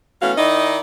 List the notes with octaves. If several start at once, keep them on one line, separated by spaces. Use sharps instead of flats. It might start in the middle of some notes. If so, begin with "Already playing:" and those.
E3 A3 B3 C#4 F#4 F5
D#3 D#4 E4 D5 D#5